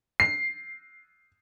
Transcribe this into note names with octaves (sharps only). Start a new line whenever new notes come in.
C7